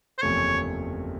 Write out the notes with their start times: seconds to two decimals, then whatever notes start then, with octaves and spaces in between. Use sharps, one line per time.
0.18 C5
0.22 F#1 E2 C3 F3 A3 C#5